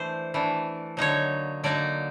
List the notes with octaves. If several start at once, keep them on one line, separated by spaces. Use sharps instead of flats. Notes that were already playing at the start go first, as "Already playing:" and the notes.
Already playing: E3 A3 D4 C5
E3 A3 D4
D3 F#3 A#3 D#4 C#5
D3 F#3 A#3 D#4 D5